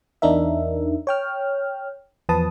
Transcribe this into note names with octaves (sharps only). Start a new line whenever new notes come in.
E2 D4 D#4 A#4 E5
C#5 G5 F6
E2 F3 B4 A5 D#6